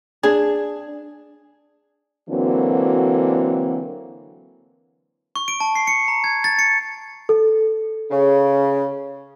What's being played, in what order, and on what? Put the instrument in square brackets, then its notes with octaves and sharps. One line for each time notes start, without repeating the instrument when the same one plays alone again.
[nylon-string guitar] D4 [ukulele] G#4
[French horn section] D3 E3 F#3 A#3 C4 F#4
[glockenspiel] C#6
D7
A5
C7
C#7
A#5
G#6
A6
C#7
[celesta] A4
[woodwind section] C#3